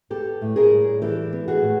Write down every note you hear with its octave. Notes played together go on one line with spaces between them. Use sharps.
B3 G4 A4
A2
G#4 A#4
G3
E3 G4 A4
B3
F#4 G#4
A2